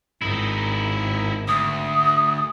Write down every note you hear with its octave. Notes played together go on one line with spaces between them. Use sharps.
G#1 D#4 E4
D2 D#6